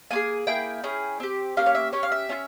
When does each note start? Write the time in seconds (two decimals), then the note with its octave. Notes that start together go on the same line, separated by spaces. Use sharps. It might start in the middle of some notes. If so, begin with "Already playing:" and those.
0.11 A#3 F4 G#4 G#5
0.47 A#3 E4 G#4 G5
0.83 C#4 E4 G#4
1.20 C4 G4
1.57 A#3 C#4 G4 F5
1.66 C#5
1.75 E5
1.92 C#4 G4 C#5
2.03 F5
2.12 E5
2.29 C#4 F4